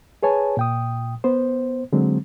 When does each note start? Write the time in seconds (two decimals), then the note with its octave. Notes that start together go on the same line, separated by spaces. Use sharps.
0.23 G#4 B4 C#5 G#5 A5
0.57 A#2 G5 D#6
1.24 B3 C5
1.93 D3 F#3 G#3 C4